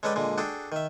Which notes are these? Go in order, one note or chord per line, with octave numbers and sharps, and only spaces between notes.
G#3 C#4 A4 B4 D5 G5
A#2 D3 G#3
D4 F#4 G#4 A4 G5
D#3 E5